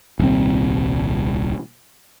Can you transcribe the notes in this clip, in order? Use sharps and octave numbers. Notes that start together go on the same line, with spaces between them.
D#1 C2 C4